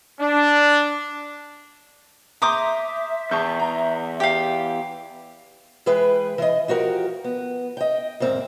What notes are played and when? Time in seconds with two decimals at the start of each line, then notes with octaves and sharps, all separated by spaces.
0.20 D4
2.42 E5 A#5 C6 D6 D#6 G6
3.31 E2 A5 C#6 G6
3.60 A#5
4.20 G4 F5
5.86 E3 G#3 G#4 B4 G5
6.38 E3 D#5
6.68 F3 F#4 G4 A#4
7.24 B3
7.77 D#5 G5
8.20 D2 G#2 C4 A#4